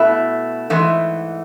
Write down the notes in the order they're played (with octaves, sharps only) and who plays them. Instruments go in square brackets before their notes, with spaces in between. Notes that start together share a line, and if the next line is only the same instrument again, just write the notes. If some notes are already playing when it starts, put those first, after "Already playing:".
Already playing: [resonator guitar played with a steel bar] B2 A3 E4
G#2 E3 A3